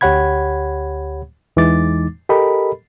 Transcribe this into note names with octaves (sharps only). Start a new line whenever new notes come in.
D2 G4 C#5 F#5 B5 G#6
E2 E3 G#3 D#4 D6 A6
G4 A4 A#4 D#5 B5